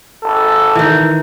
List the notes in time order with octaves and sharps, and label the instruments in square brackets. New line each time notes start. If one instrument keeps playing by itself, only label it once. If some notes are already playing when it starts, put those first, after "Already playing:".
[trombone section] G#1 A4
[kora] D#3 E3